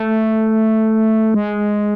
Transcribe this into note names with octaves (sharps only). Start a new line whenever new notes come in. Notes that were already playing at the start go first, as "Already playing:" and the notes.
Already playing: A3
G#3